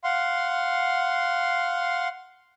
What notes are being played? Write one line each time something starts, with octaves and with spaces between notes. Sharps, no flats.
F5 F#5 C6